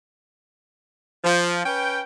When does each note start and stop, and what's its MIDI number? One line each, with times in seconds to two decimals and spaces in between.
1.24 1.60 53
1.65 2.01 61
1.65 2.01 71
1.65 2.01 79